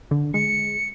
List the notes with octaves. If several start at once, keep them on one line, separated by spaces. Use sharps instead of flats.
D3
G#3 C#7